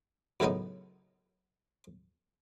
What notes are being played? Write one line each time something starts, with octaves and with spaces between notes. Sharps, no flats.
F#2 A2 C#3 G#3 B3 D#4